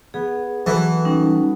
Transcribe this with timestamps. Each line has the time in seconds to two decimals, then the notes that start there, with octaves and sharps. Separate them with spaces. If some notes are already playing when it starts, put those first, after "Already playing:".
0.14 B3 G#4
0.66 E3 F#3 A4 B4
1.05 G3 C#4 D#4